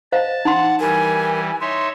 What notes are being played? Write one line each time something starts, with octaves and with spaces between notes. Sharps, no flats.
C5 D#5 F5 A5
D#4 F#5 C6
E3 G3 A#4 G#5
D#4 C#5 E5 C6